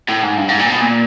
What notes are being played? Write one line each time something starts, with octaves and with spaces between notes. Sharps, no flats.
A2
G#2
G2
G#2
A#2
B2
A#2